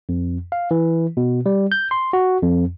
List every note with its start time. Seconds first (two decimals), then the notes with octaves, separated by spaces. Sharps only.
0.09 F2
0.52 F5
0.71 E3
1.17 B2
1.46 G3
1.72 G6
1.91 C6
2.13 F#4
2.42 F2